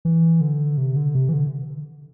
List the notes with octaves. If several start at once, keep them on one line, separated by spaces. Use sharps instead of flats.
E3
D3
C3
D3
C3
E3
D3